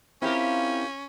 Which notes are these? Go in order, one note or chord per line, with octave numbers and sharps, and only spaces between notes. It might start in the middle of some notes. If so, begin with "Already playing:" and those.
C4 C#4 E4 F4 G4 A#4